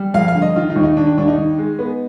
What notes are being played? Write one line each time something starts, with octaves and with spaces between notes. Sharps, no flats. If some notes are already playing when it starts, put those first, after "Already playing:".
Already playing: G3
F2 F5
F5
D3
D#5
D#3 F4
D#4
D#2
D#4
D#3 D4
D4
D#2 D4
D#4
D#3
G#3
B3